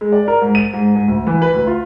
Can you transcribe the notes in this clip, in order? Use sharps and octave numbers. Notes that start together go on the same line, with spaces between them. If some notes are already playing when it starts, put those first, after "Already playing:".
G#3
D5
A#4
G#2
D#7
G#2
G#2
D2
E3
B4
D2
F4